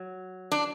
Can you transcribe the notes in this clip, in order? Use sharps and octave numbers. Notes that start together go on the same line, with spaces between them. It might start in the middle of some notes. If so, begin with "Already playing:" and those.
Already playing: F#3
D4